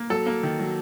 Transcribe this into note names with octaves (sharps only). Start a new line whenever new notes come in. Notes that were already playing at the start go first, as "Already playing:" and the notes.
Already playing: A#3
F#3 A4
A#3
D#3
F#3